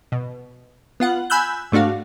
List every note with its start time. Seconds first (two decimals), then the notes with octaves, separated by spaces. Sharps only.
0.12 B2
1.00 B3 F4 F#5
1.30 G#5 B5 E6 F#6 G6
1.72 G#2 A3 D4 F#4 F5